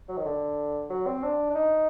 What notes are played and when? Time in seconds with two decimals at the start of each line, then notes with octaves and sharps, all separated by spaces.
0.09 F#3
0.17 D#3
0.25 D3
0.90 F#3
1.07 C4
1.23 D4
1.50 D4
1.55 D#4